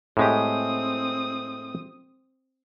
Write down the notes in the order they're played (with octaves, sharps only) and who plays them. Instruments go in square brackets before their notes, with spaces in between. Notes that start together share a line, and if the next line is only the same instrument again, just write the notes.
[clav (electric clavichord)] A2 G#3 G4 [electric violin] C4 D#6